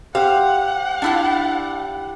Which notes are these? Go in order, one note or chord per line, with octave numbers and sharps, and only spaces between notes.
G4 C5 F5 F#5
D4 E4 F4